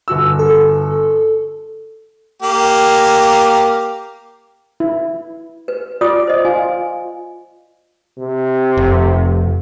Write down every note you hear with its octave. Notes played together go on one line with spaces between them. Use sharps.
G1 F#4 E6
A4
A#3 G4
E4
B4
F4 D5 D#6
C5 D#5
F4 G#5
C3
F1